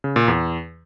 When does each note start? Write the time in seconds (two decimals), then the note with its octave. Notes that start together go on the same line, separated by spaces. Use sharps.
0.04 C#3
0.16 A#2
0.28 E2